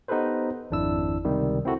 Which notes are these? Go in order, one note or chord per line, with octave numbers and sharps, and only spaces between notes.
B3 D#4 G4 A4 B4 C5
G#1 F2 D4 E4 E6
C#2 C3 D#3 G3
C4 E4 F#4 A4